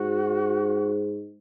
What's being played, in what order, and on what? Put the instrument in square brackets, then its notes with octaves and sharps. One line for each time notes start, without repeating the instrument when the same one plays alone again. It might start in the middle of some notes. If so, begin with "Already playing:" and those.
Already playing: [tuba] G#2 [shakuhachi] F#4